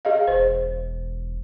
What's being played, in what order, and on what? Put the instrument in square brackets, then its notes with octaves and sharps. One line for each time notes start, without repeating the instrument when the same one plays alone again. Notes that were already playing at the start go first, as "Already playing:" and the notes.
[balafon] G#4 D#5 F5
[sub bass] E1 [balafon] C5